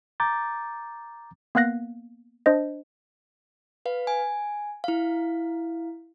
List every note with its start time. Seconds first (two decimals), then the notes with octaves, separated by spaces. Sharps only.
0.20 A#5 D6 G6 A6
1.55 A#3 B3 F5 F#6 A#6
2.46 D4 C5 D#5
3.86 B4 F5
4.07 G#5
4.84 E4 F5